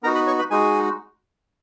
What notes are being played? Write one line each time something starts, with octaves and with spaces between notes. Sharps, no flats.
B3 D#4 F#4 A#4 A#5
B4 B5
C#5 C#6
B4 B5
G#3 D#4 F#4 G#4 G#5